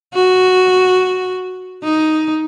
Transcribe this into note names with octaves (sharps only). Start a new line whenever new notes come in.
F#4
D#4